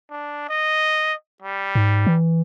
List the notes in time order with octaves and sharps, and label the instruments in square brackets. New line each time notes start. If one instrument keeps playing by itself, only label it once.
[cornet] D4
D#5
G3
[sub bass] G#2
E3